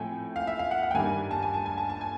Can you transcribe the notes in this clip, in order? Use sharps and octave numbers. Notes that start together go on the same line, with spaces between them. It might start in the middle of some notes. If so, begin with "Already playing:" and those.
Already playing: A2 F3 A3 C4 G5 G#5
F5
E5
F5
F#5
F#5
G5
G2 D#3 G3 A#3 G#5
A5
G#5
A5
G#5
A5
A5
G#5